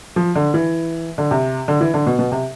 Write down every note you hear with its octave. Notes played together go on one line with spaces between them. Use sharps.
F3
D3
E3
D3
C3
D3
E3
D3
B2
B2
C3